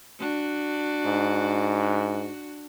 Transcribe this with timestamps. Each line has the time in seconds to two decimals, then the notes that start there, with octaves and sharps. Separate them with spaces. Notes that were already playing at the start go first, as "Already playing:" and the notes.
0.19 D4 F#4
1.05 G#2